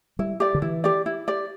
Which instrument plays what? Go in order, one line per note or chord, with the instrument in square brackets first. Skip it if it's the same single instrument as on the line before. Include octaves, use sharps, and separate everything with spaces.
[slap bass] G3 [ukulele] E4
[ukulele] G4 D5
[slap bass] D3
[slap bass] E3 [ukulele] E4
[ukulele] G4 D5
E4
G4 D5